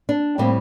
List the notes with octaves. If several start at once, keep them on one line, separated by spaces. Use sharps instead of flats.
D4
A2 G3 A#3 C4